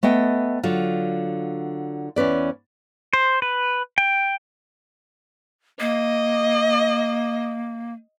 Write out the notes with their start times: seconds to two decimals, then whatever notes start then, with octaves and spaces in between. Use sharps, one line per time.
0.03 A3 B3 D#5 G5
0.63 D3 F#3 F4
2.16 E2 C#4 B4 D5
3.13 C5
3.42 B4
3.98 G5
5.80 A#3 D#5